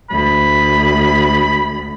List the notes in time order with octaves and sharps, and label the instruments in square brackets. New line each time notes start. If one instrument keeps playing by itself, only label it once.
[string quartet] D2 [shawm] B5